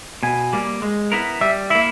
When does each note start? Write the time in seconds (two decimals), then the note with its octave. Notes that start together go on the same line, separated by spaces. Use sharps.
0.23 B2 G#5
0.53 G3 A#3
0.82 G#3
1.12 B3 E4 A#4
1.41 G3 E5
1.70 A#3 E4 E5